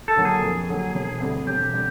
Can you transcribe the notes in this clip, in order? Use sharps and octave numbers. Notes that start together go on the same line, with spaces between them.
A4
D3 F#3 A#3
G#4
F2
D3 F#3 A#3
E1
D2 D3 G3 C4
E1 G4
D3 G3 C4